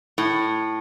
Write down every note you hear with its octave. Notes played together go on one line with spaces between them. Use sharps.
A2